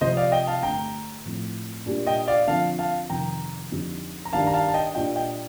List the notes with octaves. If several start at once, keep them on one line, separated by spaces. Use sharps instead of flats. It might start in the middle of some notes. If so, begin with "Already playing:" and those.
C3 F3 C4 C5 D#5
D5 F5
D#5 G5
F5 A5
G2 D3 A3 G5 A#5
A2 F3 A3 C4
A#2 G3 D4 G4
D#5 G5
D5 F5
D3 F3 C4 F5 A5
F5 A5
F2 C3 D#3 G5 A#5
F2 D3 G3 C4 D#4
A#5
G2 D#3 G3 D4 F5 A5
A#5
F5 A5
A5
D#5 G5
A#2 G3 D4 F4 D#5 G5
D#5 G5